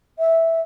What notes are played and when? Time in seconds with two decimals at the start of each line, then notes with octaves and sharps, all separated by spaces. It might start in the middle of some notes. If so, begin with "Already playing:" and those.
0.19 E5